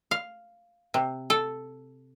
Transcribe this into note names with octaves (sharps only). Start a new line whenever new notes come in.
F5
C3
A4